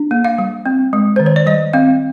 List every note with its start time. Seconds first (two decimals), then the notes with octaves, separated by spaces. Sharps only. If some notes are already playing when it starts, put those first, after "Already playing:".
Already playing: D4
0.11 A#3
0.25 F5
0.38 G3
0.66 C4
0.93 G#3
1.16 D#3 C5
1.26 C#5
1.36 D5
1.46 G3 D#5
1.73 C4 F5